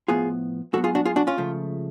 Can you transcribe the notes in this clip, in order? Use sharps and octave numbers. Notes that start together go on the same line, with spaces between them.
A2 F3 B3 F4 G#4
G#2 F#3 B3 F#4 A4
F4 G#4
D4 F#4
F4 G#4
D4 F#4
C#4 F4
C#2 C#3 F3 A3